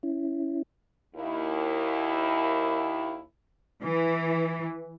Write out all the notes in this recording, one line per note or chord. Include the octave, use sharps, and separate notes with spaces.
C#4 E4
D#2 E4
E3